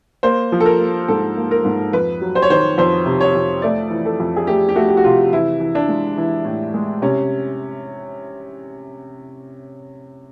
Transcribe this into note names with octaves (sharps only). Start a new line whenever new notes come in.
A#3 C5
F3
A4
A#4
A#3
G#2 A4
A#3
A#4
G#2
F2 B4
F#3
C5
C#5
D#3 C5
F2 C5
C3
C#5
F2
A3 D5
E3
A4
F2
G#4
A3 G4
G4
A3 F#4
G4
F#4
C3 F4
E3 E4
E3
D4
G#3
E3
A2
G#3
C3 C#4